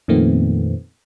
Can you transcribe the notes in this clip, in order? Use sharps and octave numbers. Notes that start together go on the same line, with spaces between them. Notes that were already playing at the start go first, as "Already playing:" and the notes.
F2 A#2 D#3 A3 B3 C4